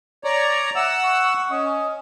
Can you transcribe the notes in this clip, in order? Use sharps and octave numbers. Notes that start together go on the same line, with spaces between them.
C#5 D5 A#5
E5 F#5 E6
C#6
C#4 D#5